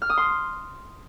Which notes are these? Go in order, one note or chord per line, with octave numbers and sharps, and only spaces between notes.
F6
D#6
C6